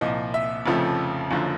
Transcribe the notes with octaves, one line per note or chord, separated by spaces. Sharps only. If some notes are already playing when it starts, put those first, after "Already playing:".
C2 A#2 F3 D#5
E5
F1 F2 C#3 F3 A3
F#1 F#2 D3 F3